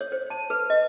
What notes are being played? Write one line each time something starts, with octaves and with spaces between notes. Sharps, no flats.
C#5
C5
A5
B4
D#5